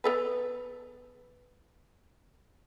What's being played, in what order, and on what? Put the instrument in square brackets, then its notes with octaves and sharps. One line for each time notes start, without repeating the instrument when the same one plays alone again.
[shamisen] B3 A4 B4